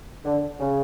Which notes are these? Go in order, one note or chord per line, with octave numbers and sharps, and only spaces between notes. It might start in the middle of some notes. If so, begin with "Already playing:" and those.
D3
C#3